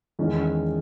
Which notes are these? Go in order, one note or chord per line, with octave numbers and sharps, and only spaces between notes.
E2 D#3 G#3 C#4